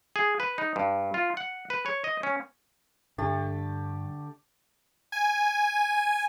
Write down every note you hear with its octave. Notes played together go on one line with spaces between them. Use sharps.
G#4
B4
D#4
G2
F4
F#5
B4
C#5
D#5
C#4
G2 D3 A3 G4 A5
G#5